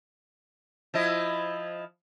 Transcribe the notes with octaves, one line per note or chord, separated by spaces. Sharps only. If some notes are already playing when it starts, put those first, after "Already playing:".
F3 E4 D#5